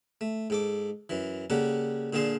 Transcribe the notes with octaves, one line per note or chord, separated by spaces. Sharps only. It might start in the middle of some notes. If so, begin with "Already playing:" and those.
A3
G#2 A4 D6
F#2 E3
C#3 G3 A#3 A4 F#5
A#2 D3 F4 G#4 A5 C6